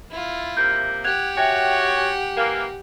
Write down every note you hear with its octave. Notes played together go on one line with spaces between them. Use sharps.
E4 F4
C3 A#3 G6
G4 F#5 F#6 G#6 F7
F#4 C#5 E5 G5 G#5
G#5
E3 A#3